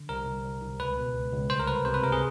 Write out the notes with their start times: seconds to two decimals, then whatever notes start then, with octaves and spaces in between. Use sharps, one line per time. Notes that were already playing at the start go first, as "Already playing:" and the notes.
Already playing: D3
0.09 C2 A#4
0.27 C2
0.44 C2
0.61 C2
0.79 C#2 B4
0.97 B2
1.14 C#2
1.33 C#2
1.50 C2 C5
1.59 A#4
1.67 C2 B4
1.85 C3 C5
1.94 B4
2.02 C3 A#4
2.12 G#4